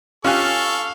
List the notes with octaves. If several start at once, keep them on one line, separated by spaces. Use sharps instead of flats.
C#4 F4 G4 A4 F5 G#5 C#6 F#6